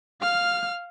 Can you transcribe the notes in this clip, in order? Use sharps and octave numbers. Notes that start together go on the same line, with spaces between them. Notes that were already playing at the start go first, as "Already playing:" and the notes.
F5 F6